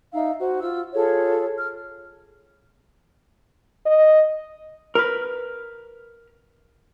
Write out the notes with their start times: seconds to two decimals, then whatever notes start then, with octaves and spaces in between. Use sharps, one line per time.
0.13 D#4 E5 F5 E6
0.39 F#4 C5
0.60 F4 E6
0.93 F4 G#4 A4 C#5
1.57 F6
3.86 D#5
4.95 A#4 B4